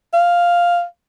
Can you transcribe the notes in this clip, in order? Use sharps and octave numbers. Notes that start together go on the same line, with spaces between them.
F5